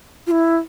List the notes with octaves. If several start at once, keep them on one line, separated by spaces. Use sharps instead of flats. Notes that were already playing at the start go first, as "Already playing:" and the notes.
F4
E4